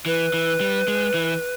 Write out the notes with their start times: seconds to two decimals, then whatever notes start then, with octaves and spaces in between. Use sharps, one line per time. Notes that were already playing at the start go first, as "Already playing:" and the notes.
0.06 E3 B4
0.34 E3
0.60 G3
0.88 G#3
1.14 E3